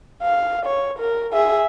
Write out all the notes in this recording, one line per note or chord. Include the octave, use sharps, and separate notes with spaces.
F5
C#5
A#4
G#4 E5